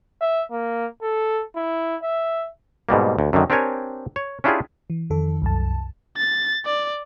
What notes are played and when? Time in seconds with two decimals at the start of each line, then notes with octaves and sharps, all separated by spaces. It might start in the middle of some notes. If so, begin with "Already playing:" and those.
0.21 E5
0.51 A#3
1.02 A4
1.56 E4
2.03 E5
2.89 G#2 B2 G3 A#3
3.19 D2
3.33 F#2 D3 D#3
3.50 C4 D4 G4 A#4 C#5 G#5
4.16 C#5
4.44 C#4 D4 E4 F4 G4 G#4
4.90 E3
5.10 F2 D#3 A4
5.42 C2 F#2 A5
6.17 A6
6.66 D5